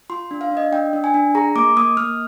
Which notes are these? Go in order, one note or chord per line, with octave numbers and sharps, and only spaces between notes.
F4 C6
D4
F5
D4
D#5
D4 G5
D4
G#5
D4
G#4 A#5
A#3 D6
A#3 D#6
A#3 F6